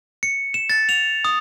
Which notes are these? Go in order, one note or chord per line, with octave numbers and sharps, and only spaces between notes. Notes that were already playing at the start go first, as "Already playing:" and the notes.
C#7
E7
A6
F7
D#6